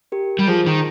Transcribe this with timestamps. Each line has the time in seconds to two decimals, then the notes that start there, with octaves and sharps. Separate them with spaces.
0.12 G4 A#4
0.39 G3
0.47 F3 G#4 C5
0.66 D#3